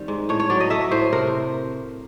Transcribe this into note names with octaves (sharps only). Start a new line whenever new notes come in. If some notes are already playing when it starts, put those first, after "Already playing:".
Already playing: D#3 G3 C4
G#2
A2 C#5
C#5
F#3 D5
D#5
A3 E5
A2 C5
C3 A#4